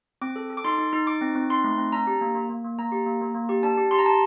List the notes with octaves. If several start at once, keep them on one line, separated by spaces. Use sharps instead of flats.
C4 D6
A4
A4
D6
D#4 C6
D#4
D#4
D#4 D6
C4
C4
D#4 C6
A3
C4
D4 A#5
G4
A#3
A#3
A#3
A#3
A#3 A#5
G4
A#3
A#3
A#3
G4
D4 A5
G4
G4 C6
A#5
G4 A5